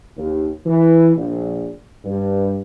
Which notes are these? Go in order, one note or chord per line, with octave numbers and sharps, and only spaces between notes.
D#2
E3
A#1
G2